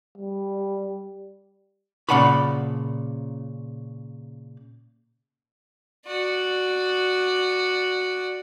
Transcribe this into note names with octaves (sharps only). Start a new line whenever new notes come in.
G3
A#2 C#3 D5 F#5 A5 B5
F#4 D5